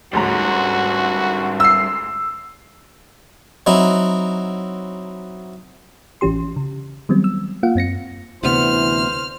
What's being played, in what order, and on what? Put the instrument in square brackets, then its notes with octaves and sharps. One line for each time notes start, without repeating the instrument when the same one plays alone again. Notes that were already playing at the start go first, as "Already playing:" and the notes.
[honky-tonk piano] D2 G#2 A#5 [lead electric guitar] G3 C#4 [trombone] F#4
[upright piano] E6 C7
[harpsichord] F#3 C4 D#4 E4
[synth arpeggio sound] A1 E3 C#4 G4 C6
C#3
D#3 F#3 G3 B3 C4
E6
A#3 F4 F5 F#5
F#2 C4 A#6 C#7
[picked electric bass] D2 C3 B3 [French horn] E3 [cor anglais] C5 [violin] F6